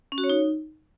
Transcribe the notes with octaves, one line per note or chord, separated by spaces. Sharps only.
C#4
F#4
C#5
D#4